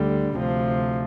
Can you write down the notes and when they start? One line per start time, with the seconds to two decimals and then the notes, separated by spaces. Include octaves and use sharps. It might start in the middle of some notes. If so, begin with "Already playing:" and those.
Already playing: D2 D3 G3
0.35 D2 C3 F3